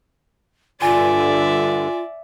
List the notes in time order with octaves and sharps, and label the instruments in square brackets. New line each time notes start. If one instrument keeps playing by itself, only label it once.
[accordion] G2 D3 [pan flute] F4 [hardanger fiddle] D5 E5 [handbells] G#5